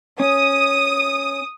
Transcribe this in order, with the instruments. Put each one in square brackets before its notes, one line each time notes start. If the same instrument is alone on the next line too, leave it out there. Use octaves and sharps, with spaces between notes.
[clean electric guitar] C#4 [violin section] D#6